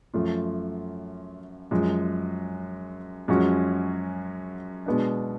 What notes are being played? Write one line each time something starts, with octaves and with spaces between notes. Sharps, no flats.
F#2 F3 A3 F4
F#2 F3 G#3
F#2 F3 G#3 C#4 F#4
B2 G#3 B3 D4